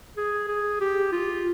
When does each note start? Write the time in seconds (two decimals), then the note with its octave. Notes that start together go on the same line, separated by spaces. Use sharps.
0.17 G#4
0.48 G#4
0.81 G4
1.12 F4